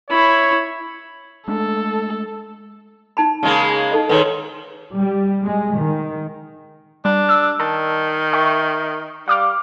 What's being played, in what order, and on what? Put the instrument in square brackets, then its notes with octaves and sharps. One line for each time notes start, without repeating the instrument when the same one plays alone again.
[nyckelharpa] E4 B5 [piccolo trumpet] C#5
[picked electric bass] G#3 A3 D4 [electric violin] A4
[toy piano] D#4 A5 B5
[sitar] C#3 G#3 A#3
[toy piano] D#4 A4 D#5
[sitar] G#2 D#3 [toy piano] B4 C#5
[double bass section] G3
G#3
D#3
[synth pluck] G3 [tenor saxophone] D4
[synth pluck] E6
[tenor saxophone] D#3 [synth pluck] A5
[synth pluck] E5 G5 C#6
[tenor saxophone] G3 [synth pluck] F5 D6 F6